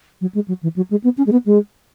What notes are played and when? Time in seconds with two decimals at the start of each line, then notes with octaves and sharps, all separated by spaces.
0.21 F#3
0.34 G#3
0.48 F#3
0.63 E3
0.76 F#3
0.90 G#3
1.04 B3
1.17 C#4
1.26 G#3
1.32 B3
1.46 G#3